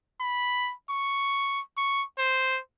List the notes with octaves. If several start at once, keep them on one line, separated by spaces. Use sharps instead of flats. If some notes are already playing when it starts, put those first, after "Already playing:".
B5
C#6
C#6
C5